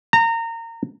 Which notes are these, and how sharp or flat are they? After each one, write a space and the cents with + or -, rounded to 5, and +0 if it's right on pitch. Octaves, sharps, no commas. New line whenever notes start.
A#5 -25